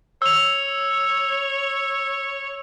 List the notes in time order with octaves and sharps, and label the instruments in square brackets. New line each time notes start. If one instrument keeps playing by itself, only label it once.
[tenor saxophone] C#5 [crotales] E6 F7